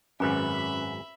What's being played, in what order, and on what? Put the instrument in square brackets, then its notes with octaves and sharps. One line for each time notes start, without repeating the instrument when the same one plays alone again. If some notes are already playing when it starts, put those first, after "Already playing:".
[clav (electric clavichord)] G#1 F#2 [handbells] C#4 B4 [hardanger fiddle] E5 B5